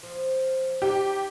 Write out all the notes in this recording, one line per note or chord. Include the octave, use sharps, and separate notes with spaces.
F3
D4 D#4 G4